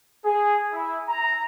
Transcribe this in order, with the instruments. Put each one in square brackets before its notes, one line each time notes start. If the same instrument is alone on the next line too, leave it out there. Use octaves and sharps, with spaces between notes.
[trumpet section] G#4
E4
A#5